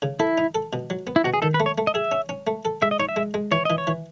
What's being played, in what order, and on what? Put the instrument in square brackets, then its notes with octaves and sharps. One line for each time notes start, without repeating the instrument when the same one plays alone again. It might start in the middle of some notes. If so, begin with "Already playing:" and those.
[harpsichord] C#3
[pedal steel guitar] E4 [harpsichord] A4
[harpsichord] D#4
A4
B2
F#3
B3
[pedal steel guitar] E4
[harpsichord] B2 [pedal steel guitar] F#4
[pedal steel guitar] G#4
[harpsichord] D#3 [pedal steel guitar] A4
[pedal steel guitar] B4
[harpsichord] A3
[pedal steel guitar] C#5
[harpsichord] A3
[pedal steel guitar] D#5
[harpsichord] G#4 [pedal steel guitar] E5
[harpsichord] C#4
C#4
A3
A4
[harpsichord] G#3 [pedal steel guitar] E5
[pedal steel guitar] D#5
[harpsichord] D#4 [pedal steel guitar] C#5
[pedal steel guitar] E5
[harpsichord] G#3
G#3
[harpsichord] E3 [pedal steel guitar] C#5
[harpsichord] E3 [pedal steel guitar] D#5
[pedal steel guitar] C#5
[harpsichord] E3